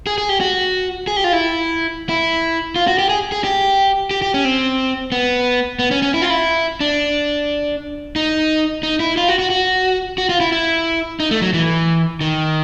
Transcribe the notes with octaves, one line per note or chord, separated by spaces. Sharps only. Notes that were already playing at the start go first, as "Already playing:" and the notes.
G#4
G#4
G4
F#4
G#4
G4
F4
E4
E4
F4
F#4
G4
G#4
G#4
G4
G4
G4
C#4
C4
B3
B3
C#4
C#4
E4
F4
E4
D4
D#4
D#4
E4
F4
F#4
F#4
F#4
F#4
F4
E4
E4
D#4
A3
F#3
E3
D#3